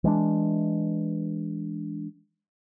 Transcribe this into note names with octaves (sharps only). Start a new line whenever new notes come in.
E3 G#3 D4